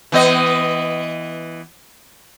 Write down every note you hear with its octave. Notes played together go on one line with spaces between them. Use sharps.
E3 B3 D#5